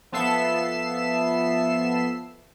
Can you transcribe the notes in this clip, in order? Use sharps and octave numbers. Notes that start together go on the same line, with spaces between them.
F3 B3 A4 E5 C7 E7